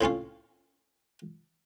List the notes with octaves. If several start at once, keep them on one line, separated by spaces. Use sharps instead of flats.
A2 C4 C#4 F4